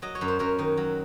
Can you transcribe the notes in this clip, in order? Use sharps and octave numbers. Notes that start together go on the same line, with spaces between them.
F#3 D#5
C#5
F#2
C5
F#2 A#4 C#5
D#3
F#3